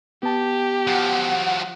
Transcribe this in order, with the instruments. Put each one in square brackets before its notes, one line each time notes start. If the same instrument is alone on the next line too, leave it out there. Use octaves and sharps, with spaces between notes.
[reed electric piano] B3 A5 [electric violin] G4
[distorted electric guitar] F3 F#3 [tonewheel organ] F#5